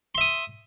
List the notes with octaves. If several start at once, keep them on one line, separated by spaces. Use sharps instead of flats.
E5 C6 D#6